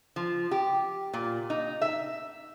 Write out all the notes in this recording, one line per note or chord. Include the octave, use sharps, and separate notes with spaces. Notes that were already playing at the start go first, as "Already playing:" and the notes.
F3
G4
A#2
D#4
E5